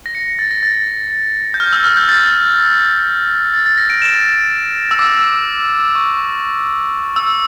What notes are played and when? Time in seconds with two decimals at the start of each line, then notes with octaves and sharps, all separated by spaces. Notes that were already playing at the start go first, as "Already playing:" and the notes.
0.06 A#6
0.15 C#7
0.39 A6
0.51 A#6
0.63 A6
1.54 G6
1.60 F6
1.73 E6
1.84 F6
1.97 G6
2.09 A6
3.54 A6
3.66 A6
3.78 A#6
3.90 D7
4.02 E7
4.91 E6
4.99 D6
5.95 C#6
7.16 E6